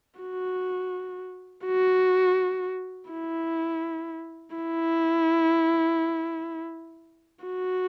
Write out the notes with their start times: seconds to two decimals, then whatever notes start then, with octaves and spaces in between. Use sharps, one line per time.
0.20 F#4
1.66 F#4
3.11 E4
4.56 E4
7.45 F#4